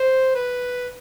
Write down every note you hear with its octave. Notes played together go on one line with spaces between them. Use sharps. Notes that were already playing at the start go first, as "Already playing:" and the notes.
Already playing: C5
B4